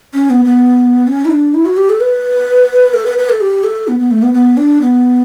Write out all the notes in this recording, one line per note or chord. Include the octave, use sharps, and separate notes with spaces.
C#4
B3
B3
C#4
E4
D4
E4
F#4
G4
A4
B4
A4
B4
B4
A4
G4
A4
B3
B3
A3
B3
B3
D4
B3